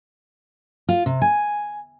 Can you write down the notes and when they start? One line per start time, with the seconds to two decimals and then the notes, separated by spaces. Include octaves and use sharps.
0.89 F4
1.06 C3
1.22 G#5